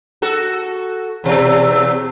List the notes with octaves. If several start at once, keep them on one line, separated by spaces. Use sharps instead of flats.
F#4 A4
E2 B2